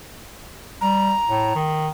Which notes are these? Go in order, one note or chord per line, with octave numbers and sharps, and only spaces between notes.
G3 A#5
A2
D#3